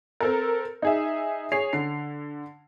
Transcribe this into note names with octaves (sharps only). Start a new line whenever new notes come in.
C4 A4 A#4
D#4 G#4 E5
G#4 C#5 C7 F7
D3 C7